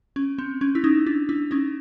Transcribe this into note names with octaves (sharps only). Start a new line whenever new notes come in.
C#4
C4
C#4
E4
C#4 D#4
D4 E4
D4 E4
C#4 D#4